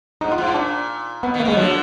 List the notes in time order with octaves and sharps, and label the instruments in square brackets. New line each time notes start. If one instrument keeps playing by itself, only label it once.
[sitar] G#2 [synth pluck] D#4
[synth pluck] F4
[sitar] G#2
[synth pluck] F4
[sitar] A#2 [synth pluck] D4
[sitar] B2 [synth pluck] B3
[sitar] B2 D#3
[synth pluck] A#3
[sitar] B2 D#3 [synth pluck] G#3
[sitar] D3 F3 [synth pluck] F#3